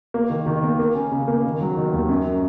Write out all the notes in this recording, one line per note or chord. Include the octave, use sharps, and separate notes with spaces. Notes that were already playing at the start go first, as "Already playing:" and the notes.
A#3
D#3
D#3
A#3
A#3
C#4
C#3
A#3
D#3
F#3
D#3
D#2
F#2